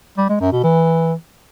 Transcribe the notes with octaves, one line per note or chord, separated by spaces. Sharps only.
G3
G#3
F#2
B2
E3